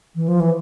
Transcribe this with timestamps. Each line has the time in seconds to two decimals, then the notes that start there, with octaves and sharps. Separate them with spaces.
0.16 E3
0.28 F3
0.40 E3